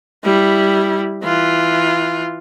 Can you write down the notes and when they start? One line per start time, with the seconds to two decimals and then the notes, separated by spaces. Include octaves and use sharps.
0.23 G3 E4
1.23 E3 F4